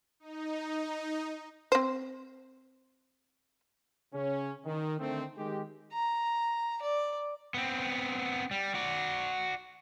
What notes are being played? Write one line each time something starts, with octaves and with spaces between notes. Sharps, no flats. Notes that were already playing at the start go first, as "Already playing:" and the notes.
D#4
C4 C5
C#3 C#4
D#3
D3 D#3 A3 C4
D#3 G#3 G4
A#5
D5
B3 C4
G3
F#4 D5